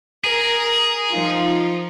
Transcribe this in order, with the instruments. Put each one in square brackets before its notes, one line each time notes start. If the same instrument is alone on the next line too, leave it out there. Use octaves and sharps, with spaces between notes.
[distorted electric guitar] G#4 [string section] A#4
[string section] F3 D#4 F4